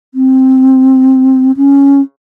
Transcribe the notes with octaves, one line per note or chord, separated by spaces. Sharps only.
C4
C#4